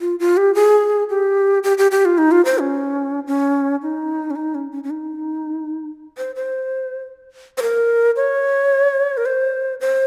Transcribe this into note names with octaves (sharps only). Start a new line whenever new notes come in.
F4
F4
G4
G#4
G4
G4
G4
G4
F4
D#4
F4
C5
C#4
C#4
D#4
C#4
D#4
C#4
C#4
C#4
D#4
C5
C5
C5
A#4
C#5
A#4
C5
C5